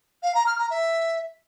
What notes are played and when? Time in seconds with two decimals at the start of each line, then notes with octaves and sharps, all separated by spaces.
0.23 F5
0.35 A#5
0.47 F6
0.58 A#5
0.70 E5